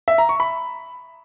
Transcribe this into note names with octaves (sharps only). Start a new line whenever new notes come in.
E5
A#5
C#6
B5